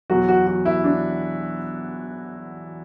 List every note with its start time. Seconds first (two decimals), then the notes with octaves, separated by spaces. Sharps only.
0.10 E2 B2 F#3 F#4
0.28 F#4
0.47 F#4
0.65 E4
0.84 D4